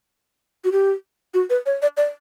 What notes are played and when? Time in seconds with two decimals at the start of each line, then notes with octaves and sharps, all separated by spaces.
0.64 F#4
0.72 G4
1.34 F#4
1.50 B4
1.66 C#5
1.82 D5
1.97 D5